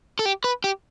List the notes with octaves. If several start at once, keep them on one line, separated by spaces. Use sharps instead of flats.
A4
G4
B4
G4